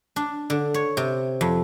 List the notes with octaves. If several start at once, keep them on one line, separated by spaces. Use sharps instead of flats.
D4
D3
C#5
C3
F2